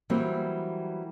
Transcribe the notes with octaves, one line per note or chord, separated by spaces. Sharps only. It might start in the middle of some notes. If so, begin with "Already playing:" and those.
E3 F#3 G3 A#3 C4